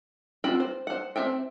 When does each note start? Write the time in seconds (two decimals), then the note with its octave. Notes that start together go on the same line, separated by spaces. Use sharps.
0.44 C4 F4 F#4 G5 B5
0.60 C5
0.87 C5 F#5
1.16 C4 C5 E5 G5